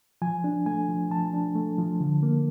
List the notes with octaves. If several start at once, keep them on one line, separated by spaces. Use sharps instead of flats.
F3 G#5
D4
A3 G#5
F3
F3 A5
D4
A3
F3
D3
A#3